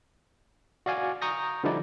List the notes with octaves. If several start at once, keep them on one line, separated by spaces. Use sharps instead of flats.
F#4 D5 F5 G#5
A#5 C#6 D#6 G6 A#6
D3 F3 G3 D#4 E4 D5